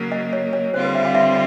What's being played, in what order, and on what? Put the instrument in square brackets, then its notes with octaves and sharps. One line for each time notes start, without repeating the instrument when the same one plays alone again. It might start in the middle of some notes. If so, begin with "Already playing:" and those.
Already playing: [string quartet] C#3 F#3 A#3
[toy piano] D#5
C#5
C#5
[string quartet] D3 G3 C4 F4 [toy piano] C5
[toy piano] B4
E5
F5
E5